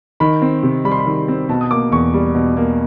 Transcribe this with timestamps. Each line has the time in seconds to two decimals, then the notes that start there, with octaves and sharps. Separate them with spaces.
0.20 D#3 B5
0.42 C4
0.63 C3
0.85 G3 B5
0.92 C6
0.99 B5
1.06 D#3
1.28 C4
1.49 B2 A5
1.61 D#6
1.71 A#3 D6
1.92 E2 C#6
2.14 G3
2.35 B2
2.57 A#3